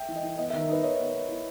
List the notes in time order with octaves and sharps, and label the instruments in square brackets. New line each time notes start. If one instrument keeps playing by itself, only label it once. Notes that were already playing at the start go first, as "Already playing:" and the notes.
Already playing: [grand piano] E5 G5
[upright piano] E3
[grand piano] D#5
[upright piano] E3
[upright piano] B3 [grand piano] D#5
[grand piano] E5
[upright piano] D#3
[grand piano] A#4
[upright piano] D#4 [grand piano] B4
[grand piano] C#5 [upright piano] D#5
[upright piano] B3
B3
E4